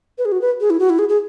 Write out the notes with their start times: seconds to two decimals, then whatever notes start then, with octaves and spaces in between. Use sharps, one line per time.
0.18 B4
0.25 G#4
0.32 F#4
0.42 B4
0.61 G#4
0.70 E4
0.79 F#4
0.90 E4
0.99 G#4
1.09 G#4